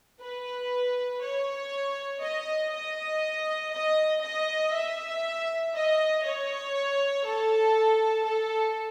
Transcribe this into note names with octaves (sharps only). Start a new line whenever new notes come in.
B4
C#5
D#5
D#5
D#5
D#5
E5
D#5
C#5
A4
A4